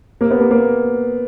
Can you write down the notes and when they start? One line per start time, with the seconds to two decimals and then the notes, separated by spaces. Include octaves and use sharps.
0.21 A#3
0.30 B3
0.41 A#3
0.51 A#3